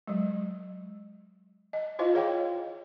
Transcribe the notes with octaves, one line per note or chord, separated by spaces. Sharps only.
F#3 G#3
D#5
E4 F4 C5 D#5 F5
G#4 C#5 F5 G5